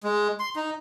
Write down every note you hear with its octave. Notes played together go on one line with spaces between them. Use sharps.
G#3
C6
D#4